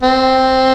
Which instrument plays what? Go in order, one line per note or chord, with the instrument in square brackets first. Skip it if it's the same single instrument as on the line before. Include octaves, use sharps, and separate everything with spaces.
[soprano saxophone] C4